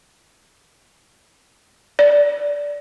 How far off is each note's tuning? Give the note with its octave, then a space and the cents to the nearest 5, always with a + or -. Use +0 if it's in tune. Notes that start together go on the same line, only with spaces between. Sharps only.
D5 -15